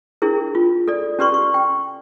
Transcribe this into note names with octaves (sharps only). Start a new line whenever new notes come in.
D4 E4 G#4 A#4
F4
A4 D5
C#4 G4 B4 D5 C6 C#6
C#6
G5